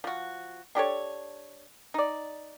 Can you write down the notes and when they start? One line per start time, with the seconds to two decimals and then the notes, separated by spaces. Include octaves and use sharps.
0.04 F3 F#4
0.75 D4 G4 A4 C#5
1.94 D#4 D5